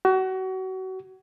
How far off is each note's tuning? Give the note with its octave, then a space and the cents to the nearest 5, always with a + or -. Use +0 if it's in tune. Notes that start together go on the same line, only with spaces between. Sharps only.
F#4 +30